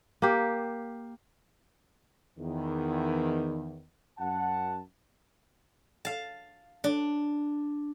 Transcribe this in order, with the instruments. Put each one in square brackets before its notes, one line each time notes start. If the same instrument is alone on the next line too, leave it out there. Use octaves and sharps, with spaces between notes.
[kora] A#3 G4
[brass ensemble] E2 D#3
F#2 F#5 A5
[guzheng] F5 A5
D4